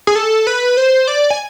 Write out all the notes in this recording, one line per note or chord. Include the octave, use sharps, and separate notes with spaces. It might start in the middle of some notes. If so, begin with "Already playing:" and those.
G#4
A4
B4
C5
D5
G#5